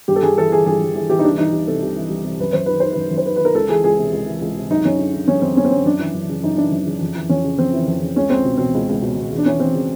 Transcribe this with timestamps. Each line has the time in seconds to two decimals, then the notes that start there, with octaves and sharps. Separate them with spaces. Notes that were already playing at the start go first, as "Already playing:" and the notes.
0.08 G2 G4
0.16 A4
0.22 G2 G#4
0.37 E3 A4
0.51 E3 G#4
0.66 G2 G#4
0.80 G2
0.95 E3 G#4
1.09 E3 G4
1.19 D#4
1.24 C2 D4
1.38 E3 D#4
1.53 C2
1.67 C3 A4
1.82 C2
1.96 E3
2.10 C2
2.24 C3
2.40 F#2 B4
2.53 F#2 C5
2.66 D#3 B4
2.80 D#3 C5
2.92 F#2 B4
3.11 F#2
3.18 C5
3.25 D#3 B4
3.36 B4
3.40 D#3
3.45 A#4
3.55 C#2 A4
3.69 E3 G#4
3.84 C#2 G#4
3.98 C3
4.13 C#2
4.27 E3
4.41 C#2
4.56 C3
4.70 F#2 D#4
4.85 F#2 C#4
4.99 D3
5.14 D3
5.28 F#2 C#4
5.42 F#2 C4
5.57 D3 C#4
5.64 C4
5.70 D3 C#4
5.85 F#2 D4
5.99 E3
6.14 F#2
6.29 C#3
6.43 F#2 D#4
6.57 E3 D4
6.72 F#2
6.86 C#3
7.01 F2
7.15 E3
7.29 F2 C#4
7.44 C#3
7.58 F2 C4
7.73 E3
7.87 F2
8.02 C#3
8.16 C#2 C#4
8.30 C#2 C4
8.45 B2
8.58 B2 C4
8.74 C#2
8.89 C#2
9.02 B2
9.18 B2
9.32 E2
9.38 D4
9.46 E3 C#4
9.60 E2 C4
9.75 C#3